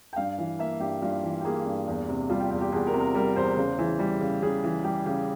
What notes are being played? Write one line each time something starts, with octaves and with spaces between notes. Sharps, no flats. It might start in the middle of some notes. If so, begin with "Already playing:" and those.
G5
G2 F5
E3
A#3 E5
G2 G4
G2 F4
E3
G4
A#3 G#4
G2
E2
C3
G3 F4
G4
E2 G4
G4
E2 G#4
A#4
C3
A#4
G3 A#4
E2 C5
C#3
E3
G3
C#3
C#3 G#4
E3
G3 G4
C#3 G4